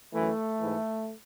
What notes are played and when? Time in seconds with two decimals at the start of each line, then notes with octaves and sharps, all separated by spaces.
0.13 F#2 E3 A3
0.60 G#2 E3